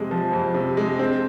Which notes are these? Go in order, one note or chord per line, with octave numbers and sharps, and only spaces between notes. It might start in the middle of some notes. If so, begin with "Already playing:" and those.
Already playing: F2 C3 F3 G#3
F3
F2
C3
G#3
C4